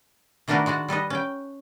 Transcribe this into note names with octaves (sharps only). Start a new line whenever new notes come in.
D#3 A3 D4 F#4 A#4 B4
G#3 F#4 F#5 A5
G3 A4 B4 D#5
C#4 G5